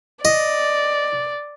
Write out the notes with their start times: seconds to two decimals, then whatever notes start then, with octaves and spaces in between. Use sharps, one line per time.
0.25 D5 D#5